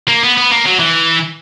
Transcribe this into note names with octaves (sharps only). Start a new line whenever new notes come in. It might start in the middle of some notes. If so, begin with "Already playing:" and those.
A#3
B3
B3
A#3
F#3
E3